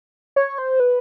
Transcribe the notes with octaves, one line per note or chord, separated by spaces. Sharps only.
C#5
C5
B4